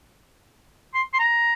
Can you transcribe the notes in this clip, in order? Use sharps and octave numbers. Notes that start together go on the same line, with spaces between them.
C6
C6
A#5